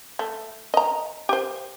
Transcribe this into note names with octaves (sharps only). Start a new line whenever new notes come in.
A3
D#5 A#5
G4 C5